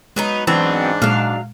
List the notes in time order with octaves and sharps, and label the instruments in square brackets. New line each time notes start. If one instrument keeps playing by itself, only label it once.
[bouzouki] F#3 B3 D#4 [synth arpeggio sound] G#3
[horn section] G#2 D4 [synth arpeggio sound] E3 A5 E6 [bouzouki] F#3 B3 C4
[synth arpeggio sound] A#2 G#3 [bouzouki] F#3 F5